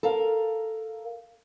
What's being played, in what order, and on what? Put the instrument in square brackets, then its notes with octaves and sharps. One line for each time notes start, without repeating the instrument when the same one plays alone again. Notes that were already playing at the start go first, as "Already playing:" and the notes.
[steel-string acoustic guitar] A4 A#4 F5